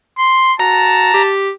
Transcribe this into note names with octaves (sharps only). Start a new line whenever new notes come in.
C6
F#4 A5 A#5
G4